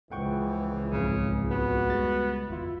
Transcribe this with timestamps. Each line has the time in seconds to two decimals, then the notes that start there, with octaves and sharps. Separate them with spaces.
0.12 C#2 E3 F3 F#5 G5 C#6
0.92 B1 F2 G#2 C#3
1.51 B3 F#4
1.88 G3 G#3 A6
2.48 G1 E2 E4 F4